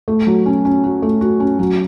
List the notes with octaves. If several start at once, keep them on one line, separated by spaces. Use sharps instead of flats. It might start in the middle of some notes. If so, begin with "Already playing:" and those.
A3
F#3
C#4
C#4
F#4
A3
F#4
C#4
F#3